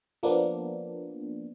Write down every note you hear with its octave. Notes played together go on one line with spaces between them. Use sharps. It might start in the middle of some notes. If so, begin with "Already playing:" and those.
F3 A#3 B3 D4